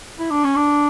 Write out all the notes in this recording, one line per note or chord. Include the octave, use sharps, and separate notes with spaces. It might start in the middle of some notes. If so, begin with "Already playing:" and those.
E4
D4
C#4
D4